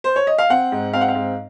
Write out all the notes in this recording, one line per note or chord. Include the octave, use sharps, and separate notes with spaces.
C5
C#5
D#5
F5
C4 F#5
G#2
C4 F5
F#5
F5
G#2